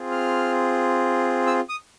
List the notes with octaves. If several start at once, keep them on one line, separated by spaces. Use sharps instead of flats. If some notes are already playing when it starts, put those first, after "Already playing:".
Already playing: C4 F4 G#4
F6
E6
D#6